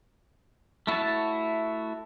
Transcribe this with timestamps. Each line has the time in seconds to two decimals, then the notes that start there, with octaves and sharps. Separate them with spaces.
0.87 A3 E4 F#4 C#5 A5